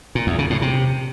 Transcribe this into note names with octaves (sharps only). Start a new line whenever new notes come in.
A#2
E2
C#3
A2
C3